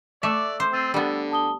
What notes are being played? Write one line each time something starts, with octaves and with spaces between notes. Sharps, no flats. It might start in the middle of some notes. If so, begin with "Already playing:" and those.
A3 D5 E5 D6 E6 F#6
C5
C4 E6 A6 D#7
D3 G3 B3
A5 D#6 G7